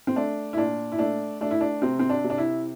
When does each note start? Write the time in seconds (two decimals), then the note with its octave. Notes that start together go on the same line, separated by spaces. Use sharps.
0.07 C4
0.16 A3 D4
0.53 E4
0.57 A#2 D4
0.92 E4
0.99 A3 D4
1.41 A3 D4
1.51 E4
1.61 D4
1.82 C3 C4
1.99 C4
2.10 D4
2.24 C3
2.30 D4
2.38 E4